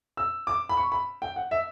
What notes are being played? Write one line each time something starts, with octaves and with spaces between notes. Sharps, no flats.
E6
D6
B5
C#6
B5
G5
F#5
E5